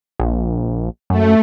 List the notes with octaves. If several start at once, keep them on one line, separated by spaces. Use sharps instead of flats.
A#1
F#2 A3